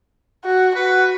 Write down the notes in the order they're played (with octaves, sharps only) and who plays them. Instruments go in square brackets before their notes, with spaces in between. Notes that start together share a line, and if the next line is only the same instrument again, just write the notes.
[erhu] F#4
[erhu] F#4 [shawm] B4